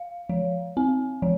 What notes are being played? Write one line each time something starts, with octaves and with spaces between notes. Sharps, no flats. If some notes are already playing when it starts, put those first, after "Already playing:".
Already playing: F5
F3
C4
F3